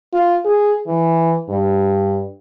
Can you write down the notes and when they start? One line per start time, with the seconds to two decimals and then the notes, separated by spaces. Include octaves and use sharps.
0.13 F4
0.45 G#4
0.87 E3
1.49 G2